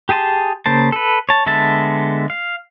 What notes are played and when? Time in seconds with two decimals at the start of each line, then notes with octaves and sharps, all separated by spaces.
0.09 G4 G#4 G#5 A5 C6
0.66 C#3 A#3 C5 A5
0.92 A4 B4
1.29 C#5 A5
1.46 D3 G#3 B3 E5 A5
2.30 F5